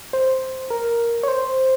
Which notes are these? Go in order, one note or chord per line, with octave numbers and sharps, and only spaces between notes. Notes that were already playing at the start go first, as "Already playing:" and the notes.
C5
A#4
C#5
C5